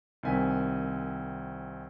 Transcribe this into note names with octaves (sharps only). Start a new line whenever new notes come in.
C2 D#3 C4 G#5 B6